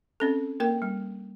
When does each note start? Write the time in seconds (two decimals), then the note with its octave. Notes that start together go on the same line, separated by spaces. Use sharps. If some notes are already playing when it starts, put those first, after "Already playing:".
0.20 C4 C#4 A4
0.60 A#3 A#4 G5
0.82 G3